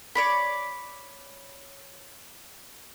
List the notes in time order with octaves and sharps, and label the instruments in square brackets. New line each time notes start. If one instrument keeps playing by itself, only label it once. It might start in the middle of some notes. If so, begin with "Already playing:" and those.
[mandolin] C#5 D5 B5